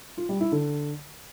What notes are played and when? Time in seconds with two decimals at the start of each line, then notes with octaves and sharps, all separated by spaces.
0.17 F4
0.29 G3
0.41 E4
0.52 D3